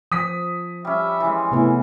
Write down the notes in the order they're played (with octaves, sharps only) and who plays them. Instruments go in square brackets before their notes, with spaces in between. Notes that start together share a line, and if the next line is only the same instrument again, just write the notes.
[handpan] F3 [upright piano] D#6 B6
[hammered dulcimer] G3 C#4 [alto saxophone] E5
[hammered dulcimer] E3 G#3
[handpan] C3 A3 B3 [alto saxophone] E4